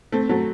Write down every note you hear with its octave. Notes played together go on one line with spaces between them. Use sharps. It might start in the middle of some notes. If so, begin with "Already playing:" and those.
A3 C4
F#3 A3